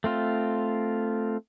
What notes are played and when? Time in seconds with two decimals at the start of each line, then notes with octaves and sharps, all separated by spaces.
0.04 A3 C4 F4